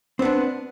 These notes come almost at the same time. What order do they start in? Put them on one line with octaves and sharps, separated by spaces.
C4 B3 D4